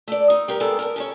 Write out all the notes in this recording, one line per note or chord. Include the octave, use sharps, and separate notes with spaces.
A3 D5
D#4
G3 G4 A#4
G#3 B3 G4 A4 A#4
A#4 G5 A5
C#4 A4 C#5